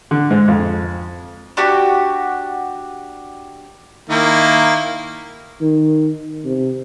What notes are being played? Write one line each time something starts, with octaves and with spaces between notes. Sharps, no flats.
D3
G#2
F2
D4 F#4 G4
D#3 A#3 E4
D#3
C3